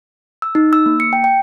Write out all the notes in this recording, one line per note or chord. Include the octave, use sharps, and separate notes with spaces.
E6
D#4
E6
A#3
C#7
G5
G5